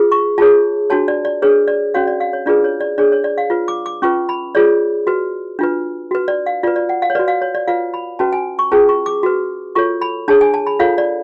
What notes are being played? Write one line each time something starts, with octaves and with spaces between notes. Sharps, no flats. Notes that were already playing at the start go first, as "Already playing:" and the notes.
Already playing: F4 G#4 B4
C#6
F4 G#4 C#5 A5
D4 F#4 C#5 A5
D5
D5
D4 G#4 B4 C#5
D5
C#4 F#4 C#5 F5
D5
F5
C#5
D4 F4 G#4 B4 D5
C#5
D5
D4 G#4 C#5 D5
C#5
D5
F5
F4 B4
D6
D6
C#4 F4 B4 C#6
B5
F4 G#4 C#5 D5
F#4 B4
D4 F4 B4
F#4 B4
D5
F5
F4 B4 D5
D5
F#5
F5
C#5
F#4 B4 D5
F5
C#5
D5
F4 B4 F5
B5
C#4 F#4 B4 A5
G#5
C#6
C#4 F4 G#4 B4 A5
C#6
D6
F#4 B4
F4 A4 C#5 C#6
B5
D4 G#4 C#5 A5
G#5
A5
B5
F4 A4 C#5 F5
D5